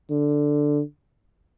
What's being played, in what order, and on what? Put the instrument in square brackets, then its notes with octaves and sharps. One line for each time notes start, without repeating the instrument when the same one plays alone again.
[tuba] D3